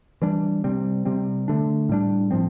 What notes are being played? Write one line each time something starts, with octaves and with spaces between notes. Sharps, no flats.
E3 G3 D4
C3 G3 C4
C3 G3 C4
D3 A3 D4
A2 G3 D4
A2 F3 C4